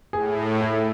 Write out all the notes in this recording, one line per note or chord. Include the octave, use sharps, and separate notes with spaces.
A2 G#4
E4